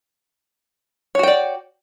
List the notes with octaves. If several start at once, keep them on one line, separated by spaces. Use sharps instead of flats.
F#4 C#5 D5 G5